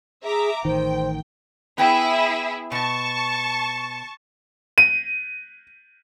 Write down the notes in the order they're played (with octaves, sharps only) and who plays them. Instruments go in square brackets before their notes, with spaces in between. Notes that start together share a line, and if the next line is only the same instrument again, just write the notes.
[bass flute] G#4 [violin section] E5 A#5 D6
[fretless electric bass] A1 D#3 [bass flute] C5 [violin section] G5
[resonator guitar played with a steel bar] B3 G5 [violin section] E4 G#4 E5
[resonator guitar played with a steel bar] B2 [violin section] A5 C#6
[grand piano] D#7